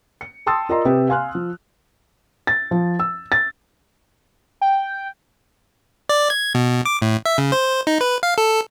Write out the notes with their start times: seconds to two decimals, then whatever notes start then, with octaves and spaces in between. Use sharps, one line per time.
0.21 C#7
0.46 G5 A5 C6 D#6 E6 A6
0.69 F4 A#4 D5 D#5 A#5 C6
0.85 C3 G4 B4
1.09 F5 G#5 C6 F6 F#6
1.35 F3
2.47 A6
2.71 F3
3.00 E6
3.32 A6
4.61 G5
6.09 D5
6.30 G#6
6.55 B2
6.85 D6
7.02 A2
7.26 E5
7.38 C#3
7.52 C5
7.87 D#4
8.01 B4
8.23 F5
8.38 A4